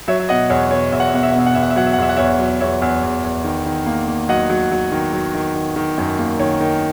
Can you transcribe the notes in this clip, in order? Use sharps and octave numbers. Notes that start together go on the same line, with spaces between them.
F#3 C#5 E5
E5
B2 D#5 F#5
E2 C#5
B2 C#5
E2 E5
F#5
E5
B2 F#5
E5
F#5
B2 E5
F#5
E2 E5
F#5
E5
F#3 F#5
E5
F#5
E2 E5
F#5
E2 C#5 E5
F#3
E2 C#5 E5
E2
E2
E2
D#3
D#3
A#3
A#3
F#3 D#5 F#5
F#3
F#3
D#3
F#3
D#3
D#3
D#3
F#2
A#3
D#3 C#5
D#3